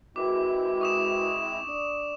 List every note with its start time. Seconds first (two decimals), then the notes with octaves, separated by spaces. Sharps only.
0.16 G#3 C4 E4 F#4 A#4 B4 D6
0.81 C#6 D#6 E7
1.67 D4 D5